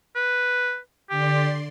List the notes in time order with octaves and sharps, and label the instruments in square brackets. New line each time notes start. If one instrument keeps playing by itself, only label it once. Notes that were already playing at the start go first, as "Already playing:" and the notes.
[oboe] B4
[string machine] D3 D5 C6 [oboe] G4